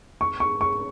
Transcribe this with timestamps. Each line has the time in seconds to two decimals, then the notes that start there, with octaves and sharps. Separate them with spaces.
0.21 C#6
0.40 C#6
0.61 C#6